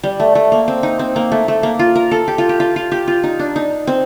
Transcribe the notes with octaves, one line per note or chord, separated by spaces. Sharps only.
G3
A3
A3
A#3
C4
D#4
C4
A#3
A3
A3
A#3
F4
A#4
A4
G4
F4
G4
F4
F4
G4
F4
D#4
D4
D#4
C4